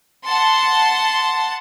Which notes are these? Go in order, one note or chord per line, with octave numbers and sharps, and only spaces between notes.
F#5 A5 C6